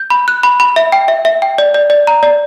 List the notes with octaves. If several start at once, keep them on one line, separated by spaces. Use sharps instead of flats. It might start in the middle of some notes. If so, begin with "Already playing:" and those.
Already playing: G6
B5
F#6
B5
B5
E5
G5
E5
E5
G5
D5
D5
D5
A#5
D5